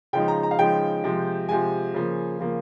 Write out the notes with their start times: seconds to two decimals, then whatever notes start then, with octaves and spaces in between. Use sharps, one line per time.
0.13 C#3 F3 G#3 D#4 G5
0.28 A#5
0.43 A#5
0.51 F5
0.59 C#3 F3 G#3 D#4 G5
1.04 C3 F3 G#3
1.49 C3 F3 G#3 G#5
1.94 C#3 F3 A#3
2.39 C#3 F3 A#3